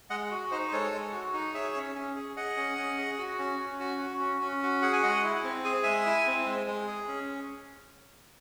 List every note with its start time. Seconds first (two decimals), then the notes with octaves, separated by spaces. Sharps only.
0.10 G#3 D#5 F#5
0.31 F#4
0.51 D#4 C5 D#5
0.68 C5
0.72 G#3 A4 C#5
0.92 G#3
1.13 F#4
1.34 D#4
1.54 G#4 C#5 E5
1.75 C#4
1.95 C#4
2.16 G#4
2.36 G#4 D#5 F#5
2.57 C#4
2.78 C#4
2.98 G#4
3.18 F#4
3.39 C#4
3.59 C#4
3.80 F#4
4.01 F#4
4.20 C#4
4.41 C#4
4.63 F#4
4.82 G#4 F#5
4.93 G#5
5.03 G#3 D#5 F#5
5.24 E4
5.44 C4
5.65 G#4 G#5
5.83 G#3 E5 G#5
6.06 E4
6.27 C4
6.46 G#3
6.67 G#3
6.87 G#4
7.08 C#4